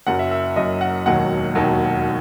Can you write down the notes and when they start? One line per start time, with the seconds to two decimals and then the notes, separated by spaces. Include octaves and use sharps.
0.07 F#1 F#2 F#3 F#5
0.19 E5
0.31 E5
0.56 F#1 F#2 F#3 D#5
0.81 F#5
1.06 E1 D#2 D#3 F#3 F#5
1.55 E1 D#2 D#3 F#3